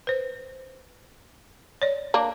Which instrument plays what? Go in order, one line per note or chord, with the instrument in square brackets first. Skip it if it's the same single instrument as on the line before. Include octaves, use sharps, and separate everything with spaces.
[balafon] B4 C5
C#5 D5
[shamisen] A#3 D4